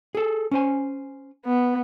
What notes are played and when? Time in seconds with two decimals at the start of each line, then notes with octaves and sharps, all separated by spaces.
0.15 G#4 A4
0.51 C#4 C5 G#5
1.45 B3